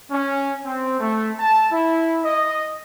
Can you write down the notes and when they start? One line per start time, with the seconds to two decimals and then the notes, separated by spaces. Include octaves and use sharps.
0.11 C#4
0.65 C4
0.99 A3
1.39 A5
1.72 E4
2.24 D#5